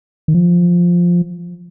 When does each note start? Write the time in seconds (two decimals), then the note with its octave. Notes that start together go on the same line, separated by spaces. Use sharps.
0.28 D#3
0.34 F3